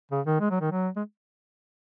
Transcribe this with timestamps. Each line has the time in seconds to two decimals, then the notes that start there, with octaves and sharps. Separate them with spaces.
0.11 C#3
0.26 D#3
0.40 G#3
0.51 F#3
0.61 D#3
0.71 F#3
0.96 G#3